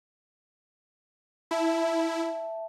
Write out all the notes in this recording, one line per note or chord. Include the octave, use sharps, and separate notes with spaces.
E4 E5 A5